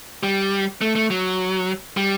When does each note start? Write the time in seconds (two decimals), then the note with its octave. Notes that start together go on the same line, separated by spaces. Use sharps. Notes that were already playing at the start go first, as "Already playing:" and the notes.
0.23 G3
0.81 A3
0.96 A3
1.10 F#3
1.97 G3